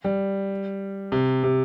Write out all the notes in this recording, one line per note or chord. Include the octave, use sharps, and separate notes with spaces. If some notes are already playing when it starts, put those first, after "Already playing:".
G3
C3
C3